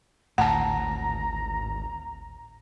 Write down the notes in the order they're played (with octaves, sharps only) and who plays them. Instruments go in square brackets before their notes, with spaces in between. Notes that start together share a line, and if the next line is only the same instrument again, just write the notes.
[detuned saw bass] G#1 [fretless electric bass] D2 A2 [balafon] F#5 A5 [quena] A#5